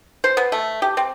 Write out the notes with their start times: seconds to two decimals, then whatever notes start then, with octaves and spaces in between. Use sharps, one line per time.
0.24 C5
0.37 B3
0.52 A3
0.82 G4
0.97 C4